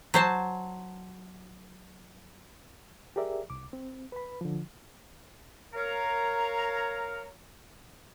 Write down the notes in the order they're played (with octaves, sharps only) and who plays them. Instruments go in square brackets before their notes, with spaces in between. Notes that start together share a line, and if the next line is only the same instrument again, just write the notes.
[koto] F#3 C5 A5
[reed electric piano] G4 G#4 A#4 D5 E5
C2 D6
C4
B4 B5
D3 F3
[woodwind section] A#4 C#5 F5 A#5